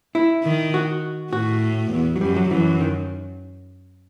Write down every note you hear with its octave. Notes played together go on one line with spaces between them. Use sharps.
E4
D#3
F#4
A2 F#4
E2
F#3
F#2 G3
F#3
F#2 E3
D#3